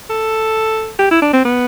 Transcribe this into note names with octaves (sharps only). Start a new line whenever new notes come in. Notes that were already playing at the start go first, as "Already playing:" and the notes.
A4
G4
E4
D4
C4
B3